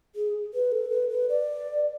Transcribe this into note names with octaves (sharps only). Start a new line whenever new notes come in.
G#4
B4
A4
B4
B4
D5